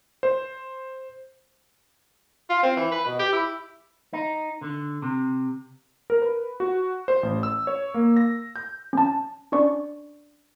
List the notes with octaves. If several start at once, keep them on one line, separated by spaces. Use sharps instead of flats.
C5
F4
C4
E3
B4
B2
G4
E4
D#4
D3
C3
A#4
B4
F#4
C5
A1
E6
C#5
A#3
A#6
G6
C#4 A5
C#4 D4 D5 C#6